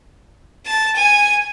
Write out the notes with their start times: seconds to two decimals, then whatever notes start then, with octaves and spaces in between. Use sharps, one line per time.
0.66 A5
0.96 G#5